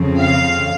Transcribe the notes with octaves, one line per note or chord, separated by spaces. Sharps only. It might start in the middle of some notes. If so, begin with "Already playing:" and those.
Already playing: F2 C#3 F3 C4
F5